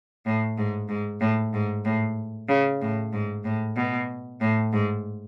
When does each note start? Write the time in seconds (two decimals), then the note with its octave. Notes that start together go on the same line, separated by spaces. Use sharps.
0.26 A2
0.58 G#2
0.89 G#2
1.21 A2
1.54 G#2
1.85 A2
2.49 C#3
2.81 A2
3.12 G#2
3.44 A2
3.76 B2
4.41 A2
4.73 G#2